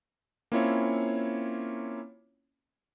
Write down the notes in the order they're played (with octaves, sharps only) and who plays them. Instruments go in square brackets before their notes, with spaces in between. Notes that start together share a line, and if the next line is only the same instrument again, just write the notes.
[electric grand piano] A#3 C4 C#4 E4 F4 C#5